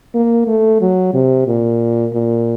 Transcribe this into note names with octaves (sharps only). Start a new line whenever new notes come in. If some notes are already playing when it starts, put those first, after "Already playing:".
A#3
A3
F#3
C3
A#2
A#2